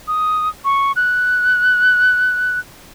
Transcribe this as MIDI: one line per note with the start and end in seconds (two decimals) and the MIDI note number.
0.08 0.49 87
0.65 0.92 85
0.96 2.59 90